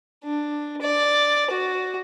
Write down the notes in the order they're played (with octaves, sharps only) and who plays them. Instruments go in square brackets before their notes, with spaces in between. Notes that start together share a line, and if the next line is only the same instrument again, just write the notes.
[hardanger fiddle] D4
D5
F#4